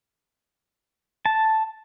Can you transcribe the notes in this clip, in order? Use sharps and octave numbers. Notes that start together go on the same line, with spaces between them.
A5